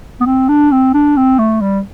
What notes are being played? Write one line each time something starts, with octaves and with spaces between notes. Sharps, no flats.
B3
C4
D4
C4
D4
C4
A3
G3